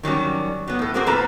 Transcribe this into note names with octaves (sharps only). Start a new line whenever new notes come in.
D#3 F#3 G3 C#4
F#3 B3
A2 A4
A#3 C4 F#4 G#4 A#4 C5
A2 F3 A4 B4 A5 A#5